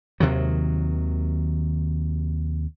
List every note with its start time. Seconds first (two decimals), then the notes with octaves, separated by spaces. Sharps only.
0.20 D#2 C3 D#3 F#3